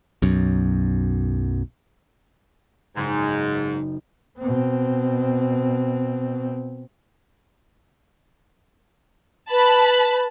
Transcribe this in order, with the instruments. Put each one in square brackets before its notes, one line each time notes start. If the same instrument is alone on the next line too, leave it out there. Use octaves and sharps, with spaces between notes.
[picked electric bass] B1 F#2
[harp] F#1 D#4 [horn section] G#2
[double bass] B2 C4
[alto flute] B4 [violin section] A5 B5